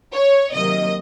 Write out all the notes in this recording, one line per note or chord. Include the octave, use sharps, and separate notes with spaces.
C#5
C3 D#3 F#3 A#3 D#5